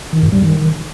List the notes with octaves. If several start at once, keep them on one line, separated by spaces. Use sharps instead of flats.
D#3
G2
G3
D#3